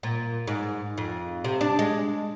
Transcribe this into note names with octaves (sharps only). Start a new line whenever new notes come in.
A#2
G#2
F2
C3
D4
G#3